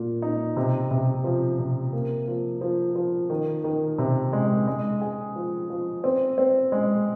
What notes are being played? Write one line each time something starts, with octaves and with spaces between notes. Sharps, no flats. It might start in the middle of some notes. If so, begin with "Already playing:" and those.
Already playing: A#2
D#4
C3
C3
F3
C3
A#3
F3
F3
F3
D#3
D#3
C3
G#3
G#3
G#4
F3
F3
C4
C4
G#3